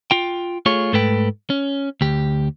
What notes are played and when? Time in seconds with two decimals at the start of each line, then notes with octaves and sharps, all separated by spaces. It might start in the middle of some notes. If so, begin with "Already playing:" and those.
0.11 F4 G5
0.66 A3 F4 G#4 C#5
0.93 G#2 A3 A4 B4 G5
1.50 C#4
2.01 D2 G4